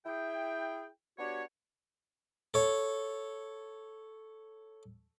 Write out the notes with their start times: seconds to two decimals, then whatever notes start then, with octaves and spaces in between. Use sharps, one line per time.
0.06 E4 G#4 G5
1.19 B3 D4 F#4 G4 C#5
2.54 A4 C#5